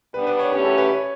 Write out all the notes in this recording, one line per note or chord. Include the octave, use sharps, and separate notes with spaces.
G3 B3 D4 B4
B4
C#5
F#2 E3 A3 C#4 G4 B4
A4
B4
C#5